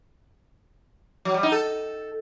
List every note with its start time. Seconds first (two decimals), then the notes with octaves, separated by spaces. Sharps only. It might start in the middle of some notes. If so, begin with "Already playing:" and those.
1.25 F#3
1.34 G3
1.43 D#4
1.52 A4